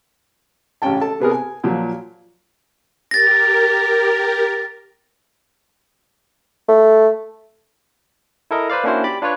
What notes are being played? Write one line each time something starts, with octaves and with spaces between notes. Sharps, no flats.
A1 C#3 C#4 G5 A5
A4 A5
C3 B3 G#4 A#4
G#5
A#2 F3 F#3
G4 A#4 A6 A#6
A3
E4 A4 A#4 D#5
B4 C5 D5 F5
A#3 C#4 D4 E4 F#4 C5
G4 D5 B5 D6
D4 F4 B4 C#5